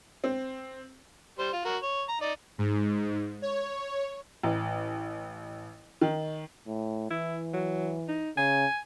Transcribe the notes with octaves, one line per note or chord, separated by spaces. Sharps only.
C4
G3 C5
F4
F#4 A#4
C#5
A#5
D#4 D5
G#2
C#5
A1
D#3
A2
E3 E4
F#3
D#4
C#3 G#5